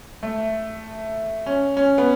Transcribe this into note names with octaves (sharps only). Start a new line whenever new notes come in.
A3
C#4
C#4
B3